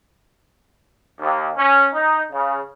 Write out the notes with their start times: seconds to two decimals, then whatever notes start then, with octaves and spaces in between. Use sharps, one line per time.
1.20 D#2
1.56 C#4
1.94 D#4
2.32 C#3